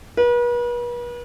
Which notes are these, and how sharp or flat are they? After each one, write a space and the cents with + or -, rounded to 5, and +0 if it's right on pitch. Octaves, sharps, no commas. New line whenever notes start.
B4 -40